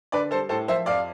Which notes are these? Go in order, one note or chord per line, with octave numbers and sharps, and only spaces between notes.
D3 B4 D5
G3 A4 C5
A2 A4 C5
F3 C5 E5
F2 D5 F5